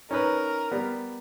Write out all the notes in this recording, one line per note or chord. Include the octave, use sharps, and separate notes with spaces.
C#4 D#4 A#4 B4
G3 B3